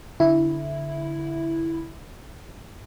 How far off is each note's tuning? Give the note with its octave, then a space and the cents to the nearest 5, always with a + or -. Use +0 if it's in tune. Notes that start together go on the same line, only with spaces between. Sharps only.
D3 -20 E4 +0